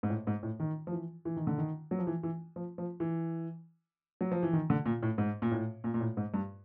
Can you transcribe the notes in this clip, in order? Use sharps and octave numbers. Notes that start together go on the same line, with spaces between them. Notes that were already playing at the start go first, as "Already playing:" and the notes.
G#2
A2
G#2
A2
D#3
F3
E3
E3
D#3
D3
D#3
F#3
F3
E3
E3
F3
F3
E3
F#3
F3
E3
D#3
D3
A#2
A2
G#2
A#2
A2
A#2
A#2
A2
G#2
G2